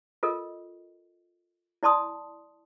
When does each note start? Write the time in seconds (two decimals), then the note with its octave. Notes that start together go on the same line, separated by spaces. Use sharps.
0.23 F4 A4 A#4 D#5
1.83 E4 D5 A5 C6 D#6